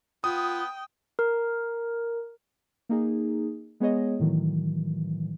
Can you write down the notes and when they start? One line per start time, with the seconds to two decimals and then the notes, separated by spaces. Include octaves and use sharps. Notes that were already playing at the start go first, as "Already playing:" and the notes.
0.24 B3 F4 G5 D#6
1.19 A#4
2.89 A#3 D#4 G#4
3.80 G#3 B3 G#4 C#5 D#5
4.20 A2 D#3 E3 F#3